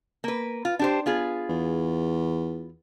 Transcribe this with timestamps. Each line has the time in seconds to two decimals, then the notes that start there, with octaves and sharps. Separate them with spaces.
0.24 A#3 B4
0.65 F4
0.79 D4 G4 C5
1.06 B3 F4 G#4
1.49 E2